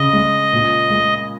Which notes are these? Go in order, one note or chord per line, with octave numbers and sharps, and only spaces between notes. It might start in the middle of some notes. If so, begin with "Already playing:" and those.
Already playing: C#3 D#5
G#3
A#2
G#3